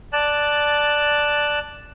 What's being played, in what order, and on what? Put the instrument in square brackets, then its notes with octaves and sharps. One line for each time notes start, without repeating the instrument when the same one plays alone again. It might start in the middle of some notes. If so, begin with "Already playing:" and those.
[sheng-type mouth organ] D5 A5 F#6